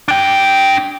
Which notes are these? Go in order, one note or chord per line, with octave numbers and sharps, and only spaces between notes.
D4 G5